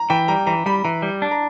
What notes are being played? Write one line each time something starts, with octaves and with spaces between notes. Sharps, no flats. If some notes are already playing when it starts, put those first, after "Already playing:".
Already playing: A#5
E3 G5
G3 A#5
E3 A#5
G3 B5
E3 A#5
G3
D4
A#5